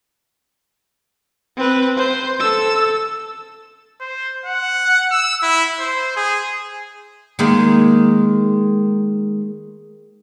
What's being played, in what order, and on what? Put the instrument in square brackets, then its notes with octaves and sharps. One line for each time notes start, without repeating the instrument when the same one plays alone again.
[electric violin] C4 B4
C5
A4 E6
[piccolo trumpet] C5
F#5
E6
E4
C5
G#4
[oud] D#3 G#3 A#3